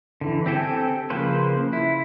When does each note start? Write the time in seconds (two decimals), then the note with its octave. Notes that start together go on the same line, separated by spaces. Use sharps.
0.21 D3 E3
0.46 C4 G4 A4 G5 G#5
1.10 C#3 F3 A#3 B4 C5
1.73 E4